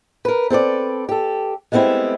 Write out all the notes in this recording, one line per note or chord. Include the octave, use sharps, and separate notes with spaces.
A#4 B4
C4 A4 B4 D5
G4 A4
G#3 A3 B3 C4 E4 G4